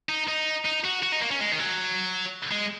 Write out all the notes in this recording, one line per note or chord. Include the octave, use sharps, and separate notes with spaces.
D#4
D#4
D#4
F#4
F#4
D#4
A#3
C#4
G#3
D#3
F#3
G#3